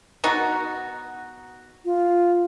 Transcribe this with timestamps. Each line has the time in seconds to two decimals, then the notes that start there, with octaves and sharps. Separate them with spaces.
0.24 B2 D#4 F#4
1.85 F4